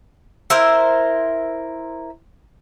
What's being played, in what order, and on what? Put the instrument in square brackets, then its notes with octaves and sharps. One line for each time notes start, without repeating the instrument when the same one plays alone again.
[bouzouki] E4 A#4 C5